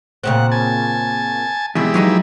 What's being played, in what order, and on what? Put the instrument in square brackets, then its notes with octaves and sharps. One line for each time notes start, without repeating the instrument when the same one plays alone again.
[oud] A#2 C#3 C4 [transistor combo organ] F#5
[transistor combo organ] G#5 A5
[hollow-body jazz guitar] E2 B2 [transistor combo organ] G3 G#3 E4
[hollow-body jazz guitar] F2 F#3 D#4 [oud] B3